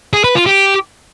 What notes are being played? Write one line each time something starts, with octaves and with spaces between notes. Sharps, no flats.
G#4
B4
F4
G4